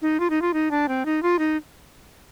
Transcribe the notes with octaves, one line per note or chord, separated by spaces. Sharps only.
D#4
F4
D#4
F4
D#4
D4
C4
D#4
F4
D#4